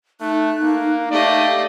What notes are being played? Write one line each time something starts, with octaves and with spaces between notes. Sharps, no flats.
A3 D#4 F#6
A#3
A3 G4 D5 D#5 F5